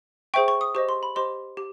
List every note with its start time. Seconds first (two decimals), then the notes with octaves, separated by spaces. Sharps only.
0.34 G#4 C5 E5 G5 C#6
0.48 C#6
0.61 D#6
0.75 G4 C5 D#5 C#6
0.89 C6
1.03 B5
1.16 G4 C5 D#5 C6
1.57 G4